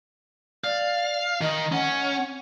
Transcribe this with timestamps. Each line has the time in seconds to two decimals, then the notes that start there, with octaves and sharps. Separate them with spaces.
0.64 D5 F5
1.41 D#3 D#5
1.72 C#4 F#5